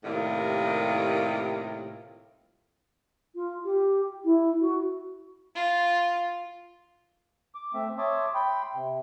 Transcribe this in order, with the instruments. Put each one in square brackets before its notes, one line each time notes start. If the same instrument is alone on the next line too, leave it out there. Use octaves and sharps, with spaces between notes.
[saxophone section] A2 C3 D#3 G3 A#3 F4
[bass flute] F4
G4
E4
F#4
[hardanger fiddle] F4
[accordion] D6
A3 C4 E5
C#5 E5 A5 C6 D6 D#6
G5 B5 C6
C3